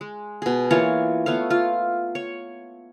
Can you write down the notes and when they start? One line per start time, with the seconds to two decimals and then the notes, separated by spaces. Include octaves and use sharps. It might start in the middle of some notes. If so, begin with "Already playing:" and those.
0.01 G#3
0.42 B2 G#4
0.71 E3 A#3 F4 C#5
1.26 A3 B3 C#5 F5
1.50 F4
2.15 C#5